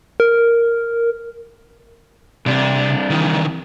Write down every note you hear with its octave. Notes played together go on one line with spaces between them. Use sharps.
A#4
C2 C3 D4
D#3 E3